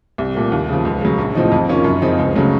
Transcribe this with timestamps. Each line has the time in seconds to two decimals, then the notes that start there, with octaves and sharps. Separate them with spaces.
0.18 C2
0.35 A#2 A3
0.52 D#2
0.68 C#3 F3
0.85 C#2
1.01 C#3 F#3
1.18 A#1
1.35 A2 F3 C4 D#4
1.52 F2
1.68 D#3 A#3 C#4 F4
1.84 F#2
2.02 C#3 F3 C4 D#4
2.18 C#2
2.35 C#3 F#3 A3